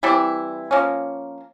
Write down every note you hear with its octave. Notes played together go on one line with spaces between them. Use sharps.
E3 G3 C4 E4
F3 A#3 C#4